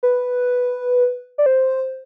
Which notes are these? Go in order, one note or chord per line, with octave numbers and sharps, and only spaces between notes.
B4
D5
C5